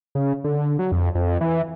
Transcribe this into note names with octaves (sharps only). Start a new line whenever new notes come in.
C#3
D3
F#3
F2
F2
E3